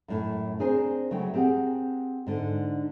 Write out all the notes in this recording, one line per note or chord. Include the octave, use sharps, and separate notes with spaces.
F#2 A2
C4 D4 G#4 A#4 C5
C#3 F#3 A3 B3 G5
C4 G4 G#4 A#4 F#5
G#2 D3